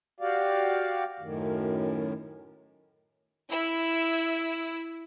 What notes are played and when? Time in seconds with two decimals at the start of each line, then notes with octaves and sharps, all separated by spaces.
0.20 F#4 G4 D5 F5
1.20 F#2 A2 D#3
3.51 E4 E6